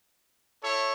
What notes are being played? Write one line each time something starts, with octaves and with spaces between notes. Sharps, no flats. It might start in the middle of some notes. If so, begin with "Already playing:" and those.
E4 A4 C#5